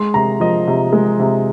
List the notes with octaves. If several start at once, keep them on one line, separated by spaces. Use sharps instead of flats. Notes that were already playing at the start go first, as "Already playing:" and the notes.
Already playing: G#3 C6
C3 A#5
F3 D#5
C3
G#3
C3